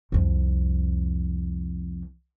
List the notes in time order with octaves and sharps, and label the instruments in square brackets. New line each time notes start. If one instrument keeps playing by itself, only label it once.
[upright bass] C2 F2